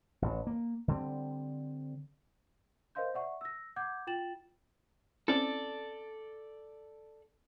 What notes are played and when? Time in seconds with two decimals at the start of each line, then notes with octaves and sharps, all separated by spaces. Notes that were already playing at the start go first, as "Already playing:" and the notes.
0.22 A1
0.47 A#3
0.88 D3 G3 C4
2.95 A#4 C5 D#5 F5 C6 G6
3.14 D5 E5 F#5 C#6
3.41 E6 A#6
3.76 F#5 D6 G6 G#6
4.07 F4 G5 A6 E7 F#7
5.28 C4 C#4 E4 A4 D5